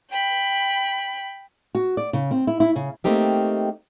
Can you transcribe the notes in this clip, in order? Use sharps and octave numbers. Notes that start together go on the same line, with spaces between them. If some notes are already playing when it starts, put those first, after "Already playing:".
G5 B5
F#4
D5
C#3
C4
E4
E4
C#3
A3 A#3 C4 D#4 G4 E5